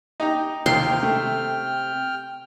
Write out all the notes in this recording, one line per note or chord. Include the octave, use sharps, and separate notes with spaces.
D#4 G4 A#5
D#2 C3 G5 C6 F6
A3